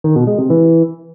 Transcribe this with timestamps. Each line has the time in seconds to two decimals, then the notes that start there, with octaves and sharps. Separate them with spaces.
0.04 D#3
0.16 B2
0.27 G#3
0.39 C3
0.50 E3